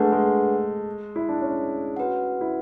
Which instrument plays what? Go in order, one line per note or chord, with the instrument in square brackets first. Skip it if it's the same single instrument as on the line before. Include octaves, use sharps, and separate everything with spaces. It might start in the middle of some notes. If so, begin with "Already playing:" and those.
Already playing: [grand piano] G#3 A3 [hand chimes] D4 G#4 B4 F#5
[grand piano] G#3
E4
D4
C#4
[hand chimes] F#4 B4 F#5
[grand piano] E4